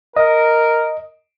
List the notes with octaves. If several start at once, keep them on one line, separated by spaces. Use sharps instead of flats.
A#4 D#5